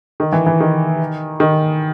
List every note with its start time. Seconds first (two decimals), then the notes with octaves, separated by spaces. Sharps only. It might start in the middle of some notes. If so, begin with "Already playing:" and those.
0.20 D#3
0.32 E3
0.46 E3
0.60 D#3
1.40 D#3